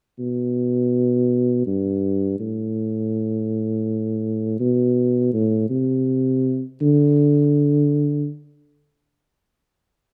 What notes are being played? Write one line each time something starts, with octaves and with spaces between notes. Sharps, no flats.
B2
G2
A2
B2
A2
C3
D3